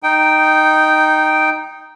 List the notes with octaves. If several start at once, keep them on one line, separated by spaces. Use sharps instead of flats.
D#4 G5